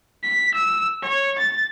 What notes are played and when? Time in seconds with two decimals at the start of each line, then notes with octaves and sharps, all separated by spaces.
0.23 B6
0.55 E6
1.02 C#5
1.39 A6